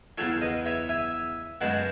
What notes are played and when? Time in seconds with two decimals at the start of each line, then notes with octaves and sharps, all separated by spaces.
0.18 E2 C#3 F#3 A4 C#5
0.41 B4 D#5
0.66 C#5 E5
0.89 E5 G#5
1.61 F#2 C#3 G#3 B3 F#5 A5